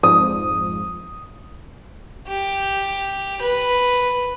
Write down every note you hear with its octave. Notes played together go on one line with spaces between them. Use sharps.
F2 G#2 F3 D#6
G4
B4